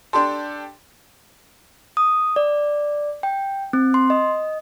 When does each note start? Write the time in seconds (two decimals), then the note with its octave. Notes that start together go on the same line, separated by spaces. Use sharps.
0.13 D4 G4 A4 C6
1.97 D#6
2.36 D5
3.23 G5
3.73 C4
3.94 C6
4.10 D#5